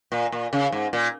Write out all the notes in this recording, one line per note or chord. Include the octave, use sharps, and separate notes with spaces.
A#2
A#2
C#3
G#2
A#2